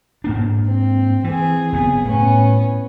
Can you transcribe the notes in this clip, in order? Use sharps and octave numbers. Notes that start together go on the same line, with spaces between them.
G#2 A#3 D4
C4
E3 C4 G#4
F#1 C#3 B3 G#4
A2 B3 C#4